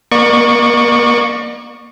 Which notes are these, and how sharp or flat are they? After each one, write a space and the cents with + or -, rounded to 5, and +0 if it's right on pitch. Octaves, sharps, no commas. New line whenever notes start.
A#3 +30 D5 +40 C#6 +0